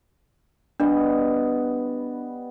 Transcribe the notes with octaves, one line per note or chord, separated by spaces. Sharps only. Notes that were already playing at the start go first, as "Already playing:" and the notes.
G3 B3 D4 D#5